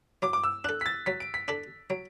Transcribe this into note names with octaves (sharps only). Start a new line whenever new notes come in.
F#3 D6
D6
E6
D4 A4 F#6
B6
A6
F#3 B6
D7
B6
D4 A4 B6
F#3 D7